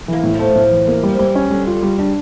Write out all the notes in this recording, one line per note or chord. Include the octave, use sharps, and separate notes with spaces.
E3 A#3
A2
F3
A3
A2
E3
A#3
G3
F3
E3 G3
C#4
D3 G3
F4
C#3 G3
C#3 D4